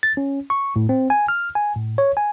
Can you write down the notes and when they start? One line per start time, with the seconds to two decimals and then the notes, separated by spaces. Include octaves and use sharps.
0.03 A6
0.17 C#4
0.50 C#6
0.76 A2
0.89 C4
1.10 G#5
1.28 F6
1.55 G#5
1.76 A2
1.98 C#5
2.17 G#5